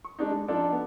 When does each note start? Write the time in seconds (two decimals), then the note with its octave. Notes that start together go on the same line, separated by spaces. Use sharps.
0.05 C#6
0.19 G#3 D4 D#4
0.31 G#3
0.48 F3 D4 D#4 F4 A4 D5
0.72 B3